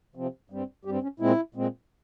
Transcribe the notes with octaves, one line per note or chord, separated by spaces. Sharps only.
C3 F3 C4
G2 G3 C4
G2 G3 C4 G4
C#4
A#2 G#3 C4 E4
A#2 G#3 C4